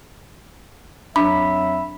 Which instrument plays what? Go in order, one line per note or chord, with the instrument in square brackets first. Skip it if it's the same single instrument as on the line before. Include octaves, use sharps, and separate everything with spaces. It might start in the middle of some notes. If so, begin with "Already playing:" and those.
[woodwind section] F2 F#3 E5 [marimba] D4 [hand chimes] B5